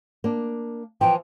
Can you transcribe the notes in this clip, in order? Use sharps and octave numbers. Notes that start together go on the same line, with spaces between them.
A#3 D4
E3 F3 G5